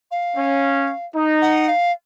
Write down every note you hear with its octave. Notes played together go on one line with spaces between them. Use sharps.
F5
C#4
D#4
F#5
F5